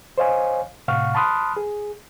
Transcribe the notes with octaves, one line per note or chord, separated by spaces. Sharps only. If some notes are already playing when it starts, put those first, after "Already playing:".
C5 C#5 D#5 F5 G#5
A2 C3 F5 F#5 C#6 F6
A5 B5 C6 D#6 F6 F#6
G#4